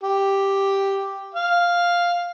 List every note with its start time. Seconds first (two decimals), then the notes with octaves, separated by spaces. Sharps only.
0.03 G4
1.34 F5